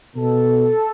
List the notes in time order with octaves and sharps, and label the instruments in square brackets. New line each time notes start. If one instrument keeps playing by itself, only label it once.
[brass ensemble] B2 A4